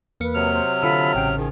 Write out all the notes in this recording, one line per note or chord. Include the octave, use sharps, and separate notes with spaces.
E2 A#3 B4 C#7
C3 F#3 F6
C5
D3 F4 A4 B5 E6
A1 C#3 G5
D#3 F3 G#4